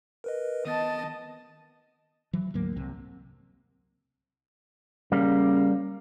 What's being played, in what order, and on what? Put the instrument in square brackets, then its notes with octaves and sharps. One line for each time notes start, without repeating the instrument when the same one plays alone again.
[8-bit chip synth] A#4 B4 D#5
[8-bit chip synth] D#3 B3 A6 [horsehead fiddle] D#5 A5
[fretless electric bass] E3 F#3
D2 G#2 F#3 A#3
C2 C3
[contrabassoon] C#3 [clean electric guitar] G3 A#3